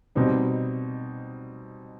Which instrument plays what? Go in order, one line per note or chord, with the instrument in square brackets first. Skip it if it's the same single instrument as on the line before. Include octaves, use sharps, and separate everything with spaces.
[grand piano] B2 G3 C4 D#4